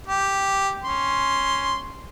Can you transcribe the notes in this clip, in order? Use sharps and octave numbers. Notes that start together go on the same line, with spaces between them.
G4
C#4 C6